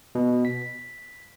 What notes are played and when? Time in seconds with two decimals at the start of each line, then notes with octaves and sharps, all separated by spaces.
0.15 B2
0.45 B6